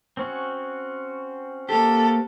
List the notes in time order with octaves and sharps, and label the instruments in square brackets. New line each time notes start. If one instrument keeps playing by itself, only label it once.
[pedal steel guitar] C4 C#4 F#4
[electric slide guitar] A#3 G4 [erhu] A4